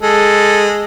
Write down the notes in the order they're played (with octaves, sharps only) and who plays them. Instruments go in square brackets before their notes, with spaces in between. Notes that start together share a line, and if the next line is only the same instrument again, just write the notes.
[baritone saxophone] G#3 [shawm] A4